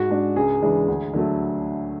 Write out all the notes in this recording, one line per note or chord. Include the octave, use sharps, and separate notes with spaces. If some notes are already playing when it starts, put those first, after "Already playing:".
Already playing: G#2 F#4
G#3 D4
C#2 G#4
C#3 E3 G#3 D4
D2
D3 F#3 A3